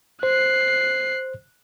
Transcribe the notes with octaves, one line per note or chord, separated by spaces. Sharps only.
C5 F#6 C7